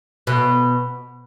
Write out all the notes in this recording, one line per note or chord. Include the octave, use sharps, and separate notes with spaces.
B2